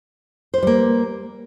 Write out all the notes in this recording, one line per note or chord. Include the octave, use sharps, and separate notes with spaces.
G3 A#3 B4 C5